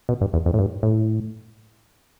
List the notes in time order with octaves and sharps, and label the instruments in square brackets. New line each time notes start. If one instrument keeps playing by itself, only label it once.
[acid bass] B2
G2
E2
F2
A2
G2
A2